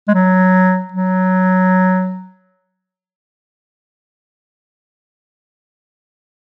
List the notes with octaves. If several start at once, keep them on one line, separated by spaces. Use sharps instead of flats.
G#3
F#3
F#3